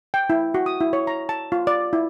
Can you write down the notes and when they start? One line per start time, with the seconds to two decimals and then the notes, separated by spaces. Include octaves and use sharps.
0.14 G5
0.30 E4
0.54 F#4
0.66 D#6
0.80 E4
0.93 C#5
1.07 A#5
1.29 A5
1.52 F4
1.67 D5
1.93 E4